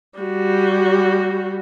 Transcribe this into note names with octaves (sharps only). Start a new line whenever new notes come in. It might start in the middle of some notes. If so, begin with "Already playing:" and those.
G3 F#4